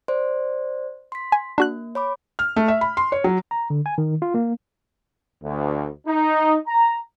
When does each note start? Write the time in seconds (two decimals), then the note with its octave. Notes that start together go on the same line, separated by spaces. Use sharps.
0.08 C5 D5 C6
1.12 C6 B6
1.32 G#5
1.58 A#3 D4 F#4 F#6
1.95 C#5 B5 D6
2.39 F6
2.56 A3
2.68 E5
2.81 B5
2.97 C6
3.12 C#5
3.24 F#3
3.51 A#5
3.70 D3
3.86 G#5
3.98 D#3
4.22 F4
4.34 A#3
5.43 D2
6.07 D#4
6.67 A#5